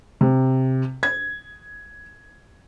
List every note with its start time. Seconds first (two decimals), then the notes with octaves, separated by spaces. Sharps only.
0.21 C3
1.03 G#6